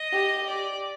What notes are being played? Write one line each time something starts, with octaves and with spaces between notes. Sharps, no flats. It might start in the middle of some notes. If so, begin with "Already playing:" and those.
Already playing: D#5
G4
D5